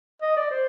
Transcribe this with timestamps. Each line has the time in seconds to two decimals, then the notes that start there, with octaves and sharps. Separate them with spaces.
0.22 D#5
0.36 D5
0.50 C5